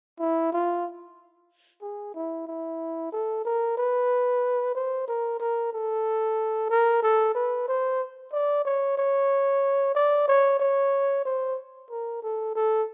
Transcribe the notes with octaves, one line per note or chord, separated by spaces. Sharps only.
E4
F4
G#4
E4
E4
A4
A#4
B4
C5
A#4
A#4
A4
A#4
A4
B4
C5
D5
C#5
C#5
D5
C#5
C#5
C5
A#4
A4
A4